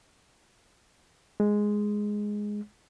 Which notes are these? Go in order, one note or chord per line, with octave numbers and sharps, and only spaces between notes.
G#3